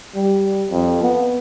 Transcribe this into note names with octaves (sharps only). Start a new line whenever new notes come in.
G3
F2
B3